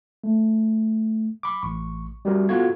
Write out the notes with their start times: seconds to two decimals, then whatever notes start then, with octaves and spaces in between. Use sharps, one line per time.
0.24 A3
1.43 B5 D6
1.63 A1 C#6
2.25 G3 F#4 G4 A#4
2.49 B3 F4 F#4 A4 F5 G#6